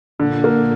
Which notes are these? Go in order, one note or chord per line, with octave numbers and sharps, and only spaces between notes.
A#2 D3 A#3
A#3